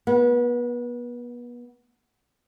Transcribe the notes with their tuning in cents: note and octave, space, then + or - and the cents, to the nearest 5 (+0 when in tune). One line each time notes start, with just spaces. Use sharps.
B3 -30